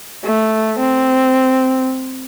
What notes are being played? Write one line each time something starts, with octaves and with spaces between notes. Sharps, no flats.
A3
C4